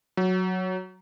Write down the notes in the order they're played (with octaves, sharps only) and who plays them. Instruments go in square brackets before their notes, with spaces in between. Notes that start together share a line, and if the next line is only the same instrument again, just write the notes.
[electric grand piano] F#3